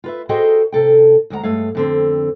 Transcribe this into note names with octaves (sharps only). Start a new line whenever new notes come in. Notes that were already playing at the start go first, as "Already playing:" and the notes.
F4 B4 E5
F#4 G#4 A4 C5 D#5 G5
C3 A4 G5
D2 G#3 D5 F#5 A#5
G2 G#3 A3 C#5 F5
F2 D3 C4